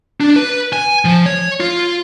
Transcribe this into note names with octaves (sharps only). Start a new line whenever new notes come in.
D4
B4
G#5
F3
C#5
F4